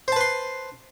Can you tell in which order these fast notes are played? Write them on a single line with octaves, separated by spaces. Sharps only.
C5 A5 B4 C6